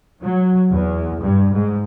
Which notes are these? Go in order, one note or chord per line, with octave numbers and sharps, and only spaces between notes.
F#3
E2
G2
G#2